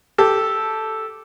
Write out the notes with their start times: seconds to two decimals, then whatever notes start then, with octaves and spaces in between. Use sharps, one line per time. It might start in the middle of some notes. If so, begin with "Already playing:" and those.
0.18 G4 A4